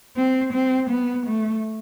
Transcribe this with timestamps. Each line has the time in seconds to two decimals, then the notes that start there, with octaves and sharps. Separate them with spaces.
0.17 C4
0.53 C4
0.90 B3
1.26 A3